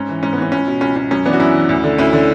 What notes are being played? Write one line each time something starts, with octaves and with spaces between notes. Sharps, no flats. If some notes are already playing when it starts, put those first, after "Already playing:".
Already playing: G#2 C#4
E3
G#2 C#4
B3
E3 C#4
C#2 C#4
B2
C#2 C#4
B2 C#4
F#2 C#4
E3 B3 D4
F#4
F#2 C#4 E4
E3
D2
D3
D2 C#4 E4
D3